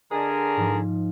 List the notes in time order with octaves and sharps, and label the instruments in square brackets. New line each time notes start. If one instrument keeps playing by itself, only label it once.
[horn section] D3 G#4 A#4 [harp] D#5
[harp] G#2 F3